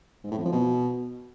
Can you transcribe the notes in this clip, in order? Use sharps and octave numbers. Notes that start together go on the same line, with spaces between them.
G#2
A2
F2
F3
B2